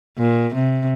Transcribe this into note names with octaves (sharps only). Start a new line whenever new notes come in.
A#2
C3